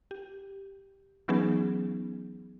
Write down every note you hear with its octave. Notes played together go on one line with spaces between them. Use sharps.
G4
E3 F#3 B3 C#4 D#4 G#4